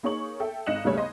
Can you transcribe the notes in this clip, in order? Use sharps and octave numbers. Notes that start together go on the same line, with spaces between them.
A#3 D#4 G#4 C#5 C#6 F#7
A4 E5 G5
G#1 D#5 F#6 C#7 E7 F#7
D#2 C#3 G3 A3 C#5 G#6
C5 D#5 C6